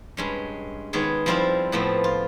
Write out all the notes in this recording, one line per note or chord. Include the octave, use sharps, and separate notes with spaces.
G2 G#3 C#4
D#3 G#3 B3 G#4 C#5
F3 G3 C4 E4 F4 G4
A2 F3 B3 C4
F4